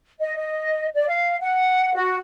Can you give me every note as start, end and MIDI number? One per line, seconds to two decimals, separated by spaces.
0.20 0.34 75
0.35 0.86 75
0.93 1.04 74
1.08 1.36 77
1.40 1.92 78
1.94 2.15 66